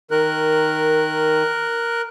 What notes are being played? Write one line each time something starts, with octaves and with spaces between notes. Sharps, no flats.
D#3 A#4 F#6